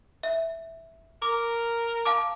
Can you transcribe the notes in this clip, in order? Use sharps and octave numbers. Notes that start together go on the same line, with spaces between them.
E5
A#4 D6
F5 A5 D6